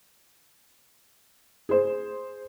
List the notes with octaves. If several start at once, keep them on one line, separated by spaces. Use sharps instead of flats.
G#4 C5